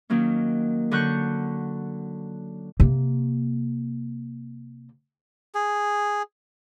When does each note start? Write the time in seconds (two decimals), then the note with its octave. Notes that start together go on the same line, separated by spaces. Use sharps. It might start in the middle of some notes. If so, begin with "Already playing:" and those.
0.10 D#3 F#3 A#3 C#4
0.91 D3 F#3 F#5 C#6 F#6 G6
2.80 C3 A#3
5.55 G#4